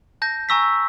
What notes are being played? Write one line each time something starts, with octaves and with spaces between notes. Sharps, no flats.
A5 G6 A#6
G#5 A#5 C#6 E6 A#6 B6